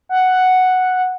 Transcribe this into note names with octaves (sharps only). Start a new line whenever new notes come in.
F#5